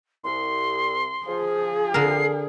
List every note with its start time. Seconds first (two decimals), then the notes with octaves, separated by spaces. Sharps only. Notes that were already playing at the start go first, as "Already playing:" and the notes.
0.24 C2 C6
1.27 F3 G#4
1.94 D3 A#4 C7